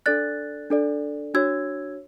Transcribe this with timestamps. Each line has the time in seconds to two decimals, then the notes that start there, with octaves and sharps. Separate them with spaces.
0.06 D4 A4 D5 F#6 A6
0.70 D4 A4 D5
1.34 D4 F#4 C#5 E6 G#6